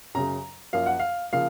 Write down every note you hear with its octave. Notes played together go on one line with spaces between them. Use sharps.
F#2 C#3 F#3 A#5
F#2 F3 A#3 F5
F#5
F5
C#3 F3 A#3 F5